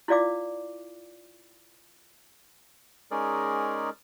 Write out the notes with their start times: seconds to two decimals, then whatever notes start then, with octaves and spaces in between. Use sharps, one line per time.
0.08 E4 F4 D5 F5 D6
3.11 G#3 C#4 D#4 G#4 A#4 D5